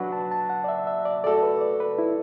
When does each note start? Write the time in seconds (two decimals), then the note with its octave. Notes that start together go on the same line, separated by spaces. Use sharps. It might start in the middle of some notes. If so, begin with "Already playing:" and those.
Already playing: F#3 D4 F#4 B4 F#5
0.12 A5
0.31 A5
0.50 F#5
0.64 D5
0.68 E5
0.87 E5
1.05 D5
1.24 A3 F#4 A4 D5
1.43 B4
1.61 D5
1.80 B4
1.99 E4